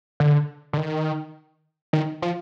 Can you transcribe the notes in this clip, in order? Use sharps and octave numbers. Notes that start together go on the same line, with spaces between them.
D3
D3
D#3
D#3
F3